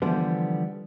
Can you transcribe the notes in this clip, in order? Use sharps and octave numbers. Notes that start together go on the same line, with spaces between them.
D3 E3 F3 G3 B3